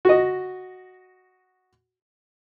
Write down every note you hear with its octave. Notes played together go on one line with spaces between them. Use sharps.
F#4 D#5